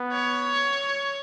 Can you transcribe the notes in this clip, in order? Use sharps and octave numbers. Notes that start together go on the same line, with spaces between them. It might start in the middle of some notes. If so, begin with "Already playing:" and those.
Already playing: B3
C#5